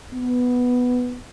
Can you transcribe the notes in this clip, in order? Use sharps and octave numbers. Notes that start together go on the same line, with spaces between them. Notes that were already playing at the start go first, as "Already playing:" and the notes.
B3